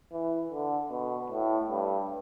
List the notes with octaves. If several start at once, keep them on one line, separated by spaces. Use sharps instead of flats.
E3
D3
B2
A2
G2